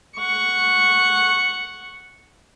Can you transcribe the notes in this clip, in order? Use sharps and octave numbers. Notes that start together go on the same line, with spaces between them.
F#5 C#6